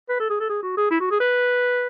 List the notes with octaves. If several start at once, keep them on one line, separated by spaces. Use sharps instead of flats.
B4
A4
G#4
A4
G#4
F#4
G#4
E4
F#4
G#4
B4